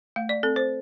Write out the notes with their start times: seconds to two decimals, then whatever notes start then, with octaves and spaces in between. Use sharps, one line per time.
0.16 A3 F5
0.29 D5
0.43 C4 A4
0.56 C5